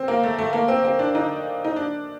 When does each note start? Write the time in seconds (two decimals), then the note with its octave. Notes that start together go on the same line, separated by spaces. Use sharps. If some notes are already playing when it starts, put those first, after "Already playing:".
Already playing: C4
0.08 A#3
0.23 A3
0.38 A3
0.53 A#3
0.68 C4
0.84 C4
0.99 D4
1.15 D#4
1.64 D#4
1.76 D4